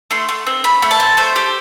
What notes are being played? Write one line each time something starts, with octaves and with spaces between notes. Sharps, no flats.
A3 C6
A3
C4
A3 B5
A3
A5
C4
A3 C5
G4